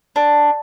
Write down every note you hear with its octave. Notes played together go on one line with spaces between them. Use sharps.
D4